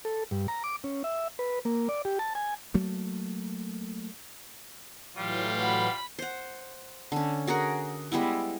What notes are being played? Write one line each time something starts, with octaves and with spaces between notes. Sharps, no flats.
A4
G2
A#5
D6
C#4
E5
B4
A#3
D5
G4
A5
G#5
F#3 A3 A#3
A2 E3 F#3 G3 F4
F#5 B5
C5 F#5
D3 C#4
F#4 G#4 A#4 F#5
G3 G#3 B3 E4